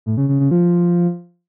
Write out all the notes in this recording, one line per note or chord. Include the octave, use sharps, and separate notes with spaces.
A2
C#3
C#3
C#3
F3